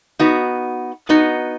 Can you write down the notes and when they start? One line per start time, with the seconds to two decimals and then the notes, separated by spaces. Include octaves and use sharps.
0.19 B3 D#4 F#4
1.09 B3 D#4 F#4